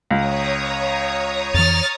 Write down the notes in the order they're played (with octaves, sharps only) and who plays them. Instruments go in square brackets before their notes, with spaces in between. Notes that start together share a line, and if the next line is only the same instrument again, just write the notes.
[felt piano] C#2 [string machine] C#5 A#5 D#6
[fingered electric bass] F2 E3 [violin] F6 A6